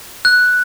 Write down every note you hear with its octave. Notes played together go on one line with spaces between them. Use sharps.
F#6